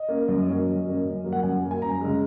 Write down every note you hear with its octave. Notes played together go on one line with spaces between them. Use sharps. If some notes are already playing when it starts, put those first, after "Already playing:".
Already playing: D#5
A#3 C#4
F#2
F#3 A#3 C#4
F#2
F#3 A#3 C#4
F#2
F#3 A#3
F#5
F#2 G#5
F#3 A#3
G#5
F#2 A#5
C#3 G#3